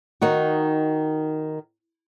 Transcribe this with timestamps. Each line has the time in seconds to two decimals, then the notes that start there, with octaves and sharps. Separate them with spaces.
0.22 D#3 D#4 F#4